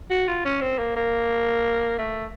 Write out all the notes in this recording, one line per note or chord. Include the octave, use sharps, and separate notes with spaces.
F#4
F4
C#4
C4
A#3
A#3
A3